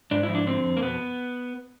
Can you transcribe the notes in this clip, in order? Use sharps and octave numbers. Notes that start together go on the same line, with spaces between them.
G#2 D4
E4
F3
D4
D3 C4
F2
A#3
B2 B3